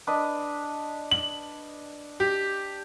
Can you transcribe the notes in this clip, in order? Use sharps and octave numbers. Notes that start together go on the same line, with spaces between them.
D4 B4 D#5
F#7
G4